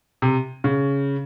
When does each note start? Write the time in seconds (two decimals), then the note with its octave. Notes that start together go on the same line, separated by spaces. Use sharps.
0.22 C3
0.64 C#3